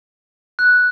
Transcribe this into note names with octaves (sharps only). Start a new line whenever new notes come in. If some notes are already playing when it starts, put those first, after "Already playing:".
F#6